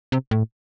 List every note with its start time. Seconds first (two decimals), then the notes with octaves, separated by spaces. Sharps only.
0.12 C3
0.31 A2